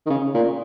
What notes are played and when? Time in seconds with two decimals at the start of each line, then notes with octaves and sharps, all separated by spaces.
0.06 D#3
0.10 C#3
0.34 A#2